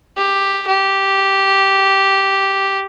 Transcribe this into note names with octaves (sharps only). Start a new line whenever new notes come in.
G4
G4